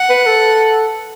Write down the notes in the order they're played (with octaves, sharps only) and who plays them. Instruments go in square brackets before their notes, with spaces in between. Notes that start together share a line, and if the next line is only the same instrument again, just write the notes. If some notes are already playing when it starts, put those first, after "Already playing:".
Already playing: [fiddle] F#5
[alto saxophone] B4
A4